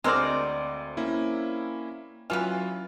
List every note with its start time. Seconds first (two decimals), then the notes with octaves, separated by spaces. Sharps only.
0.04 D2 G#3 C4 A#4 C5 D5
0.97 A#3 C#4 E4
2.30 E3 F#3 C#4 F4 B4 F6